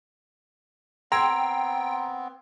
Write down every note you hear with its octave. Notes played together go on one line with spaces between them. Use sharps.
B3 C4 G5 A#5 C6 E6 G#6